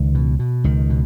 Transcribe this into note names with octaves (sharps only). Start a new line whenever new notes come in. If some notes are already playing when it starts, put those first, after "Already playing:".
Already playing: C#2 D#3
B2
B2
C#2 D#3
B2